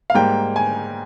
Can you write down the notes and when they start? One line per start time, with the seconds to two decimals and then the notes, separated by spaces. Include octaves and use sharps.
0.10 F5
0.14 G#2 G3 A#3 G5
0.56 G#5